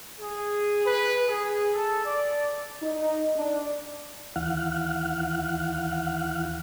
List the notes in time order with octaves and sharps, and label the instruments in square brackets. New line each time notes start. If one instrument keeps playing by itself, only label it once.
[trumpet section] G#4
B4
G#4
A4
D5
[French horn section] D#4
D4
[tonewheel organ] D#2 E3 F5 F#5